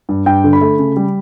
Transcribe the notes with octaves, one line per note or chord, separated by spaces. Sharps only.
G2
G2 G5
D3
B5
A3
C#3
G3